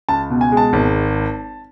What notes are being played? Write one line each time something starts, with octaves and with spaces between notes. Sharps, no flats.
C#2 A5
B2
G#5
G#3
A5
G#1